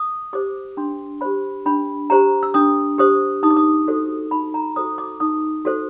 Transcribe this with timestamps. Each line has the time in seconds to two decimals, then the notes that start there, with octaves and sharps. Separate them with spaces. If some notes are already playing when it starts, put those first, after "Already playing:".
Already playing: D#6
0.33 G4 C5 D6
0.77 D4 C6
1.21 G4 C5 B5
1.66 D4 B5
2.10 G4 C5 A#5
2.43 E6
2.54 D4 D#6
2.98 G4 C5 D#6
3.43 D#4 D#6
3.50 D6
3.57 D#6
3.88 F#4 A4 C5
4.31 D#4 B5
4.54 A#5
4.76 F#4 A4 C5 D#6
4.98 D6
5.20 D#4 D#6
5.65 F#4 A4 C5